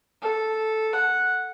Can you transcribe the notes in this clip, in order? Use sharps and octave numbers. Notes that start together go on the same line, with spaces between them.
A4
F#5